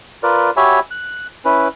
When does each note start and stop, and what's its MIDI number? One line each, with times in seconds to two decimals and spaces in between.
0.23 0.50 65
0.23 0.50 70
0.23 0.50 71
0.23 0.50 74
0.57 0.80 66
0.57 0.80 67
0.57 0.80 73
0.57 0.80 76
0.57 0.80 80
0.57 0.80 83
0.91 1.27 90
1.45 1.68 61
1.45 1.68 64
1.45 1.68 71